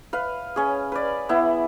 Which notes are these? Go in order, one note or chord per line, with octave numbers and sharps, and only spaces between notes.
B4 F5
C#4 G#4
B4 D5
B3 E4